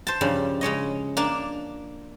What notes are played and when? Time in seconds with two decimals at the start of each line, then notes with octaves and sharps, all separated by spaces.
0.07 C5 A5
0.21 G2 C#3 F3 G3
0.61 C#3 G#3 C#5 D#5
1.17 A#3 D4 A5